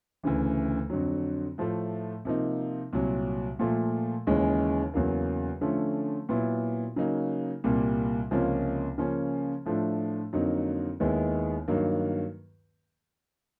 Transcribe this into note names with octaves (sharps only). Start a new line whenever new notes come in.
D2 C#3 E3
F2 D3 F#3
A2 F3 A3
C3 F3 A#3 D#4
C2 A#2 F#3
A#2 F3 A3
D#2 C#3 E3 G#3 C#4
E2 C#3 F#3 A#3
D3 F3 A3 C#4
A#2 F#3 B3 E4
C#3 F#3 A#3 D#4
C2 A#2 G3 A#3
C#2 C3 F3 A#3 C#4
C#3 F3 A#3 C#4
A2 F3 A3 D4
F2 D3 F#3 A#3 D#4
D#2 D#3 G#3 B3 E4
G2 D#3 F#3 A#3